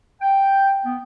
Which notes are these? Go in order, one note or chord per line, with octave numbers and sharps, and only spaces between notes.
G5
B3